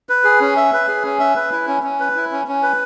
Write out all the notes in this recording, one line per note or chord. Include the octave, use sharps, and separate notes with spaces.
B4
G#4
C#4
E5
B4
G#4
C#4
E5
B4
E4
C#4
C#4
B4
E4
C#4
C#4
B4